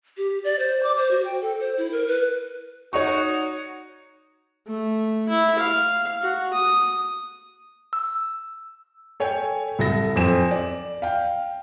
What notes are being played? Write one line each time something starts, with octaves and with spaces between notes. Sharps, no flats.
G4
D5
C5
D6
C5
F#4
G5
A4
C5
E4
A#4
B4
D#4 F#4 C#5 C#6
A3
E4
F5
F#4
D#6
E6
A4 C#5 G5 G#5
C2 A4 A#6
F2 C5 G#5 E7
D5
F5 G5